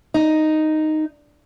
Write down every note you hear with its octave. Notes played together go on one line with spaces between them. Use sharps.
D#4